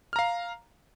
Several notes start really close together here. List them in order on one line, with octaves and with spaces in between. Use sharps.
F6 A#5 F5